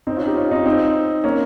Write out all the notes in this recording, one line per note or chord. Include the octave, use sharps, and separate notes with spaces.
C4 D#4
C#4 F4
D#4 G4
C#4 F4
C4 D#4
C4 D#4
A#3 C#4